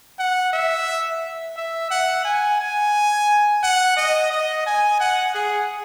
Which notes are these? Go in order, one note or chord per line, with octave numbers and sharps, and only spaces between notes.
F#5
E5
E5
F#5
G#5
G#5
F#5
D#5
D#5
G#5
F#5
G#4